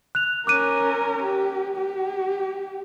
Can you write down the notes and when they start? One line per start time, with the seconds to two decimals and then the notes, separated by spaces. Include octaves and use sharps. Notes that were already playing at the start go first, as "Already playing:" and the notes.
0.15 F#6 F7
0.47 C#4 A#4 D6 F#6 D#7
1.23 G4
1.76 G4